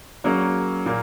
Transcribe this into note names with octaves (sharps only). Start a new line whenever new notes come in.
F#3 A#3 C#4 G#4
A#2 A#3